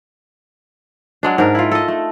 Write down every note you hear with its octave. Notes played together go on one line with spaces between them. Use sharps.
F#3 G#3 D4
G#2 D4 A#4
E4 F4
A4 D#5
A3